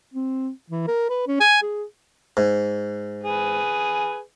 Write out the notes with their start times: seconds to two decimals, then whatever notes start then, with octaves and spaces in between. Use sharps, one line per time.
0.14 C4
0.70 E3
0.88 A#4
1.09 B4
1.27 C#4
1.40 G#5
1.62 G#4
2.37 G#2
3.24 G#4 B4